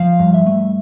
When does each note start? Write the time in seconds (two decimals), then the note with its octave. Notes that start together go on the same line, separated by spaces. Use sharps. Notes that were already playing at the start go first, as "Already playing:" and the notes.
Already playing: F3 F5
0.19 G2
0.34 E5
0.47 A3